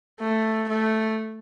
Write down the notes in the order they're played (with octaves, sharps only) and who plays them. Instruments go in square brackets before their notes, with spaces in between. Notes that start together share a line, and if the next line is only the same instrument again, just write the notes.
[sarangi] A3
A3